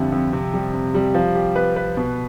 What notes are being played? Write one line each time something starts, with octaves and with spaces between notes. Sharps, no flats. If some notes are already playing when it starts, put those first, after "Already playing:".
Already playing: F2 D3 G3 E4
F2
C3
G3
C3
G3
F3
G4
B4
B4
B2